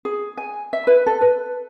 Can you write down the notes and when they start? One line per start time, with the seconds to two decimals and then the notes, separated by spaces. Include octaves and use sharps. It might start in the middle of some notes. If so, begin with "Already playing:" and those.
0.05 G#4
0.37 G#5
0.73 E5
0.87 B4
1.06 A4
1.21 B4